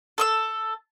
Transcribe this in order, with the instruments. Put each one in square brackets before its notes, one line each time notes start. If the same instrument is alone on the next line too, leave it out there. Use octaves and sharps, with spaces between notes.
[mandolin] A4 D#6 E6